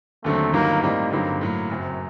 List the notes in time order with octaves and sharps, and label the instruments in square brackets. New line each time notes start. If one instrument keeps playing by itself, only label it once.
[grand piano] D#2 D3 F#3 C4 [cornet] A3
[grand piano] G1 G2 D#3 F#3 [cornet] A#3
[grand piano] A2 G3 C4 D#4 [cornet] A#3
[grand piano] G2 D3 F#3 C4 D#4 [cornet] A#3
[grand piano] A2 F#3 A#3
[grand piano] F#1 F#2 F#3 [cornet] C4